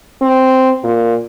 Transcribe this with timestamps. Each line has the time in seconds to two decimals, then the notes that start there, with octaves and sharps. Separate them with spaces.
0.22 C4
0.84 A#2